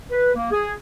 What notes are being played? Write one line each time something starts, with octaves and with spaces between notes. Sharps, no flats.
B4
A#3
G#4